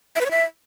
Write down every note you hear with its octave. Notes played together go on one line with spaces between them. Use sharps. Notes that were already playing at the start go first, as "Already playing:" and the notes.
E5
B4
C#5
E5